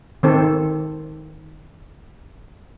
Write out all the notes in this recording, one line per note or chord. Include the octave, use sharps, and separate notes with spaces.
D#3 C4 A4